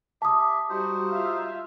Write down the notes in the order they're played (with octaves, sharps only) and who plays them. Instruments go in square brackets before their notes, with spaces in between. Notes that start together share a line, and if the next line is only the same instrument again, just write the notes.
[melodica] G4 E5 [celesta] A5 D#6
[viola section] G3 F#4 G4 [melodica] D#4 C5
[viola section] F4 E5 F5